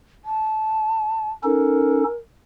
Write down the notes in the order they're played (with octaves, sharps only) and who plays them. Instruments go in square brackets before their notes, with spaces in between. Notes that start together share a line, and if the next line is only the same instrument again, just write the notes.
[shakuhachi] A5
[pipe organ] C#4 D#4 A4 [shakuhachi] A#4